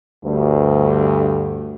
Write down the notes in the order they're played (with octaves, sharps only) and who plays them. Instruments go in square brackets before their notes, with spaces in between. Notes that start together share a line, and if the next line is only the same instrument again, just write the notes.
[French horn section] D2 G2